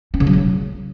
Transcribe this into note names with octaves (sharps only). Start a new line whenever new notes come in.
C#4
C#3
F#3
C#3